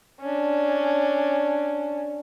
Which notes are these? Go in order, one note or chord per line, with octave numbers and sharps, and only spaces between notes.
C#4 D4